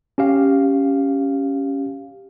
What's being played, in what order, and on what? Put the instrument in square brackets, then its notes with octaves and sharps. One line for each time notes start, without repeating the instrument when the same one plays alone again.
[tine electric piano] C#4 G4 F5